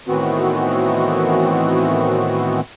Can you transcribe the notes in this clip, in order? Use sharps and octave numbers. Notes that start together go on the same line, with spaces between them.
A2 D#3 E3 B3 C4 F#4